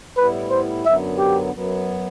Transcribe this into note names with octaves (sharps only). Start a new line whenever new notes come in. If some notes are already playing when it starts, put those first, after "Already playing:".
A2 G3 B3 E4 B4
C5
F#2 D3 F#3 B3 E5
G4
F#2 F#3 B3